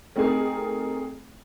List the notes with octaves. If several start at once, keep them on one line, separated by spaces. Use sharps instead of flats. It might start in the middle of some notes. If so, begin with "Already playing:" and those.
A3 C4 D#4 G4 G#4 A#4